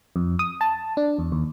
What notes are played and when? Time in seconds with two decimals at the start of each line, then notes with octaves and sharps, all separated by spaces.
0.16 F2
0.39 D#6
0.61 A5
0.97 D4
1.19 E2
1.32 D#2